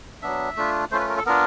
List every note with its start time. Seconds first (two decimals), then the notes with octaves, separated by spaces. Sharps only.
0.22 F#3 B3 D4 E5
0.57 A3 D4 F4
0.91 A3 C#4 F4 C5
0.99 B4
1.09 A#4
1.17 A4
1.26 B3 D4 F4 A#4